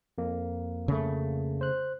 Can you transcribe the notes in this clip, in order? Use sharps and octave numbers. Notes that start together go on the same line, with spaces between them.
F2 A#3
C#3 A3
C5 F#6